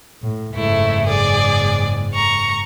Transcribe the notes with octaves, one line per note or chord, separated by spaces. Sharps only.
A2
F#1 G#2 A3 E4
G#4 D5
A#5 C#6